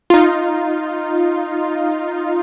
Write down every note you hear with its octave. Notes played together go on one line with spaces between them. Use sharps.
D#4 F4